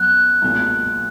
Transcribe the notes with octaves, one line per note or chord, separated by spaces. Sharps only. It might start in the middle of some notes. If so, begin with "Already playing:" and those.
Already playing: F#2 B3 F#6
B1 A#2 G#3